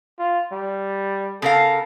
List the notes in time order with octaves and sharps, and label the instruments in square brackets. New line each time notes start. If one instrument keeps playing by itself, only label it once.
[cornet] F4
G3
[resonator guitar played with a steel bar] C#3 A#4 F5 [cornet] A4